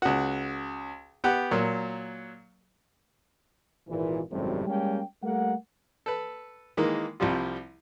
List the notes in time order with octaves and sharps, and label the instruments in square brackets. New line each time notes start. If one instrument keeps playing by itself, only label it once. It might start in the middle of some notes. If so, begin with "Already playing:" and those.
[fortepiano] C#2 F#4
B3 G4 F#5
A#2 F#3
[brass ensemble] G#1 A#2 E3
G#1 F#2 A2 C3 G3 C4
G3 G#3 A#3 C#4 G5
G3 A3 A#3 A#4 F#5
[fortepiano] A4 B4
D#3 E3 G#3 A#3
C2 F3 G3 F4